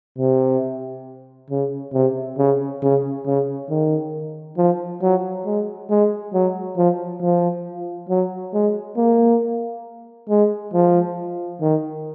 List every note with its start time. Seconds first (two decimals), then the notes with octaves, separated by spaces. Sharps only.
0.18 C3
1.50 C#3
1.93 C3
2.38 C#3
2.82 C#3
3.26 C#3
3.69 D#3
4.57 F3
5.02 F#3
5.45 G#3
5.90 G#3
6.34 F#3
6.77 F3
7.22 F3
8.09 F#3
8.53 G#3
8.97 A#3
10.29 G#3
10.74 F3
11.61 D#3